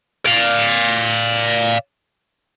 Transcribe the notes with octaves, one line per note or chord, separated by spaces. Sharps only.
D5 F5